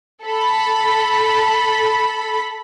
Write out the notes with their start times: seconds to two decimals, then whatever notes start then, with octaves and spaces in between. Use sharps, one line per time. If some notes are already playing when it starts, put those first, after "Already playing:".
0.23 A4 B5